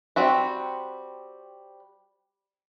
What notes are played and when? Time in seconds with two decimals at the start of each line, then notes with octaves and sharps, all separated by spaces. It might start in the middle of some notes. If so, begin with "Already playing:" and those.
0.16 G3 C4 F#4 E5